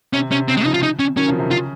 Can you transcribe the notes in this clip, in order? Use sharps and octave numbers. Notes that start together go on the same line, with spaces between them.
C3 C#4
C3 C#4
C#3 C4
G#3
C#3 F3 D#4
F4
D#4
C#4
D#3 F#3 C#4
C#3 F3
C3 D#3
C#3 F4